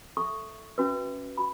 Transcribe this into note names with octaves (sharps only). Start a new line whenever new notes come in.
A4 E5 C#6
C#4 F#4 B4 E5
F#4 B5